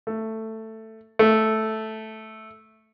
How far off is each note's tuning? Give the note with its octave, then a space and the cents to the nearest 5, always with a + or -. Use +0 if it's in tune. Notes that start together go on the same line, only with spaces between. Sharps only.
A3 +10
A3 -5